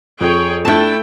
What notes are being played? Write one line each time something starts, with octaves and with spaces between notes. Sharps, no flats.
F2 G#4 C#5 G5
A3 D4 E4 G5 A5